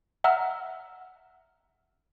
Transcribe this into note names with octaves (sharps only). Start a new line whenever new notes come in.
E5 F#5 A#5 E6 F6